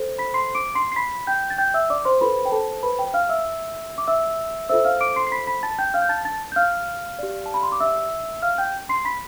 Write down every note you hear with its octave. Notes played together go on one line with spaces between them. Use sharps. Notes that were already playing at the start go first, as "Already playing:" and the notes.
Already playing: A4 C5
B5 B6
C6 C7
D6 D7
C6 C7
C7
B5 B6
G5 G6
A6
G5 G6
E5 E6
D5 D6
C5 C6
F4 A4 B4 C5 B5
G5
A4 A5
B4 B5
G5
F5 F6
E5 E6
D6
E5 E6
F4 A4 C5 E5 E6
F5 F6
D6 D7
C6 C7
C7
B5 B6
B5 B6
A5 A6
G5 G6
F5 F6
G6
A5 A6
A5 A6
G6
F5 F6
G4 D5
A5
B5
C6
D6
E5 E6
F5 F6
G5 G6
C6 C7
B5 B6